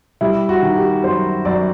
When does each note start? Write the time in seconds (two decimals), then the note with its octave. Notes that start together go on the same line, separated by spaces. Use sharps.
0.21 G3 E4
0.49 F#4
0.62 D#3
0.77 G4
1.04 F#2 C5
1.45 F#2 D5